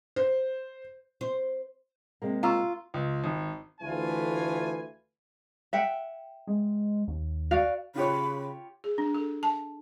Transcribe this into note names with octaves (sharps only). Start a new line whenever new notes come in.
C5
C5
C3 G#3 A#3
F4 A#5 C#6 E6
C#2
G#1
D2 E3 A3 F4 G#5
E5 F#5 G5
G#3
D#2
F#4 D5 F5
C#3 F4 G4 C#5 B5
G#4
D4
A4
A5